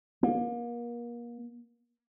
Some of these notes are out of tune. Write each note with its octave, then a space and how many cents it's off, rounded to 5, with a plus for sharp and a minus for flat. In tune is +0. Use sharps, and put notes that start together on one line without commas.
A#3 +35